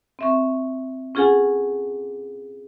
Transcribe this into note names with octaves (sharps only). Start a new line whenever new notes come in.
C4 E5 C#6
C#4 F4 G#4 A4 F#5 G#5